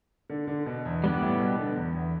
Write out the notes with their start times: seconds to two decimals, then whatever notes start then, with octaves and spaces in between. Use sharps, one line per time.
0.30 D3
0.47 D3
0.66 B2
0.85 E2
1.03 G2 G3 B3 G4
1.22 A2
1.39 B2
1.59 D3
1.77 E2
1.95 E2